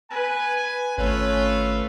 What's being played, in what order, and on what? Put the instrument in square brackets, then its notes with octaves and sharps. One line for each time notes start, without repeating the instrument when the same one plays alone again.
[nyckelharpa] B4 [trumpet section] G#5
[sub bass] G#1 [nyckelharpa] A3 [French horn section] C#4 C#5 [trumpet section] F4 B4